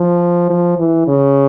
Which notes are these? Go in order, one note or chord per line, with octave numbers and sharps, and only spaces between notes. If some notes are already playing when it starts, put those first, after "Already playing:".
Already playing: F3
F3
E3
C#3